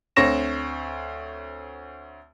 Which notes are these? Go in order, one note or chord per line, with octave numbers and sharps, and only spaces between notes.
D2 C4 C#5 C#6 A#6 E7